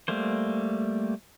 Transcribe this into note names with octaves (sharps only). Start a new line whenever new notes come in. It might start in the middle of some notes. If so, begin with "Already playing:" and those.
G3 A3 A#3 C5